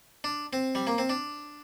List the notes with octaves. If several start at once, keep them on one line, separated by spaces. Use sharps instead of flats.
D4
C4
G3
A#3
C4
D4